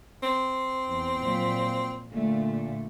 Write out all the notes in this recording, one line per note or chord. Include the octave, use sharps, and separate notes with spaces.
C4
E2
A#2 F3 F#3
A#2 D3 A3